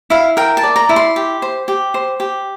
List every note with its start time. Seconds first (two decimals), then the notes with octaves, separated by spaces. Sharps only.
0.10 E4 F5
0.37 A#4 G5
0.57 A5
0.63 D5
0.76 A#5
0.89 E4
0.96 C6
1.16 G4
1.42 C5
1.68 G4
1.94 C5
2.20 G4